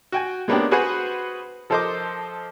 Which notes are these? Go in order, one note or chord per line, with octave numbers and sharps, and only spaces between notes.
F#4 G5 G#5
G#3 A#3 B3 C#4 D4 G4
F#4 G#4 B4 C5 F#5 G#5
F3 A4 A#4 C5 D#5 D6